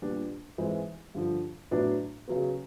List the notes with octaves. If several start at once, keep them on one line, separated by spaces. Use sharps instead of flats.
A#2 G3 B3 D4
G#2 E3 G#3 C4
G2 D3 F3
A2 F#3 B3 D4
C#3 F#3 B3